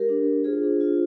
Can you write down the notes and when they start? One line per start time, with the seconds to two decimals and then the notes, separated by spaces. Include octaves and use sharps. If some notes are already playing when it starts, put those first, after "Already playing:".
Already playing: G#3 G4 A#4
0.09 D4
0.28 D4
0.44 F4 G#4 C5
0.63 D4
0.81 F4